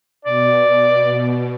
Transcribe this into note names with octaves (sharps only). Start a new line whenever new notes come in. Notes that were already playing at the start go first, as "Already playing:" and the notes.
B2 D5